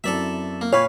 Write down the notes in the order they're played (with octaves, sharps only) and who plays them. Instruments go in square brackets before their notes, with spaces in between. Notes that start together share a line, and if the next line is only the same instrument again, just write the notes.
[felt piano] F#2 C4 E4 [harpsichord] A4 D5 E5
[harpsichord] A#3
[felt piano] A#2 [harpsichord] B4 F5 [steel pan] C#5